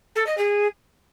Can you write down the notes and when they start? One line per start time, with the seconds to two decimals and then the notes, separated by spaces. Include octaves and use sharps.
0.15 A4
0.26 D#5
0.37 G#4